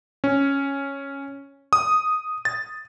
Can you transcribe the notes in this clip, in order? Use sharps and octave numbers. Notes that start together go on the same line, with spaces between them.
C#4
D#6
A6